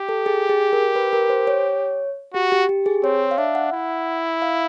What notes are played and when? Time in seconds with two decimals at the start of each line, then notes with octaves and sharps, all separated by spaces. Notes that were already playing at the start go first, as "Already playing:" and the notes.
Already playing: G4
0.09 A4
0.26 G#4
0.49 G#4
0.73 A#4
0.96 B4
1.13 A#4
1.30 C5
1.47 C#5
2.34 F#4 G4
2.52 G4
2.69 G4
2.86 G#4
3.04 C4 C#5
3.31 F5
3.38 D4 E5
3.55 F#5
3.73 E4
4.42 F5